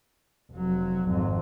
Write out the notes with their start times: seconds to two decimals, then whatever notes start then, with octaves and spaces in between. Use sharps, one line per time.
0.52 F1 F#3
1.08 G#1 F2